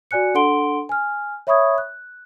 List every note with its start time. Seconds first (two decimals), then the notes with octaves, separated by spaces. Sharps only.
0.11 F#4 D5 G#5 F#6 C#7
0.34 D4 A4 F#5 C6 D7 G7
0.89 G#5 F6
1.47 C#5 E5 B5 C#6 D#6 G#6
1.78 F#6